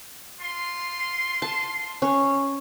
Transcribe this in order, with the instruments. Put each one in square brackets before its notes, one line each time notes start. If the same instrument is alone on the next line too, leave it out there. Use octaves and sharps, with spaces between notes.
[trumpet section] F4 C6
[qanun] A5
C#4